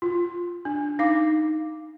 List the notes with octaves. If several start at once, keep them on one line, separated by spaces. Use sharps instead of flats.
F4
D4
D#4 F5 D6